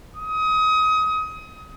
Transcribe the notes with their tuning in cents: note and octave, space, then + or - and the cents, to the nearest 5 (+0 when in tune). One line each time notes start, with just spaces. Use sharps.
D#6 +25